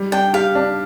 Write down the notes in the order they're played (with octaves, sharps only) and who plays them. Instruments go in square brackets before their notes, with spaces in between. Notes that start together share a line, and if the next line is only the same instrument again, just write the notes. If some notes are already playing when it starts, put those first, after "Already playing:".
Already playing: [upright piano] G3
[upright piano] D4 [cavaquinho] G5
[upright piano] G4 [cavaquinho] F5
[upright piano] D4